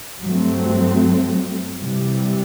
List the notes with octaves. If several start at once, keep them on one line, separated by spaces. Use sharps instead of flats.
G2 F#3 A3 C4
C3 E3 G3